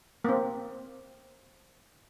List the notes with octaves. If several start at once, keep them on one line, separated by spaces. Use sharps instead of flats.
A#3 C4